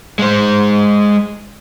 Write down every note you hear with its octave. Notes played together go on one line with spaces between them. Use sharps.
G#3 C5